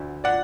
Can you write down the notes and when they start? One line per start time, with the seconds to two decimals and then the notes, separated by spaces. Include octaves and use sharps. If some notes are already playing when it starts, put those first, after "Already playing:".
Already playing: D2 D3
0.24 D5 F#5